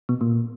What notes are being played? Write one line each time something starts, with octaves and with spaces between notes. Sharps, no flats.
B2
A#2